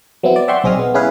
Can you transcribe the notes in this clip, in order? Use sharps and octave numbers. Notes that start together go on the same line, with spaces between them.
F#3 B3 C4 E4
D5
D5 E5 F#5 G5 C6 C#6
B1 C4 G#4 D#5 D#6 F6
B3
G#3 C#4 E4 G#4 B4 F5